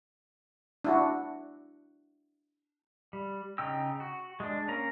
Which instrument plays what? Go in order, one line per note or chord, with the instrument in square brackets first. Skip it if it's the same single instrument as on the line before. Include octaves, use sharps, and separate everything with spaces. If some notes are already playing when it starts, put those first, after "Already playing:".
[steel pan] D4 E4 F#4
[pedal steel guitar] G3
C#3 D#4 G5 E6
F#4
G#3 D4
A#3 C#4 A#5